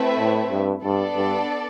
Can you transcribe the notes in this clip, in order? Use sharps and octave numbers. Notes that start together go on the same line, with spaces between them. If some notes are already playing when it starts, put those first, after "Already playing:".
Already playing: A3 C4 E4 B4 E5
A2
G2
G2 B3 D4 A4 D5
G2